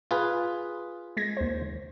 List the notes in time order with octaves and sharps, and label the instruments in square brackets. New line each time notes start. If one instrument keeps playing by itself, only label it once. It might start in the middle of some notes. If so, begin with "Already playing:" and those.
[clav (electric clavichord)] F4 G#4 B4
[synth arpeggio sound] G#3 G#6 A#6
D#2 C5